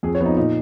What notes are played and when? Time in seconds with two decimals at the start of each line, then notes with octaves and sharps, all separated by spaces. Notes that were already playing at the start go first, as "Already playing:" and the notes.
0.03 F2 G#4
0.15 C#5
0.20 F3 B3
0.26 D#4
0.36 A#2 D#4